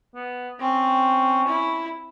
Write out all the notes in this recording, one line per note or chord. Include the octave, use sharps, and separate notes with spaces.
B3
C4 C#4
E4